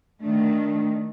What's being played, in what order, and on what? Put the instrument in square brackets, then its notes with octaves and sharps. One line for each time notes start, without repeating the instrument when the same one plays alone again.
[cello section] D#3 A3 [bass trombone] D4